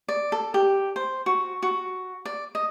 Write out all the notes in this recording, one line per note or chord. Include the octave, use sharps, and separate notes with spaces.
D5
A4
G4
C5
F#4
F#4
D5
D#5